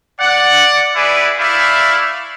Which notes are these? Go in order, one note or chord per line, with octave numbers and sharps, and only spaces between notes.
D5 F#5
E4 G#4 B4 D5
A3 E4 D5 E5 F5